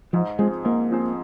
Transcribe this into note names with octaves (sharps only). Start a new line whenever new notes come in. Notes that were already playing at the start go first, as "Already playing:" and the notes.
G#2 F3
F3 G#3 C4 G#4 C5
G#2 A#3
F3 C4 G#4 C5